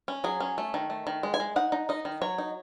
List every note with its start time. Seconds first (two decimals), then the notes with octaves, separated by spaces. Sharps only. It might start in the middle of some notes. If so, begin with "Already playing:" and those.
0.08 C#4
0.24 F#3 G#4
0.40 C#4
0.58 A3
0.74 D#3
0.90 A3
1.07 D#3
1.23 G#3
1.34 G#5
1.40 G#3
1.56 D#4 F#5
1.72 D#4
1.89 D#4 D#5
2.05 D#3
2.21 F#3 C#5
2.38 D#4